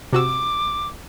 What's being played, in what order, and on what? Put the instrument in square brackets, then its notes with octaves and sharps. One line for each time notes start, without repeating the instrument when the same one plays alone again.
[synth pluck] C3 F#4 E6 [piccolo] D6